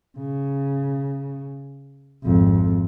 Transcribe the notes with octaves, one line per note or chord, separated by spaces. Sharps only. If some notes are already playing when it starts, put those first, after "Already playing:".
C#3
G#1 F2